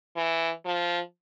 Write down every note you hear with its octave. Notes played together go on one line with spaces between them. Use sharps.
E3
F3